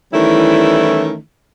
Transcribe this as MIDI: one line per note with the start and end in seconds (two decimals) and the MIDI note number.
0.13 1.16 51
0.13 1.16 52
0.13 1.16 55
0.13 1.16 57
0.13 1.16 61
0.13 1.16 64